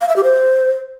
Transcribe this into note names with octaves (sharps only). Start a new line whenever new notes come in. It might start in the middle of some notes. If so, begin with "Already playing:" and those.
F5
E5
G4
C5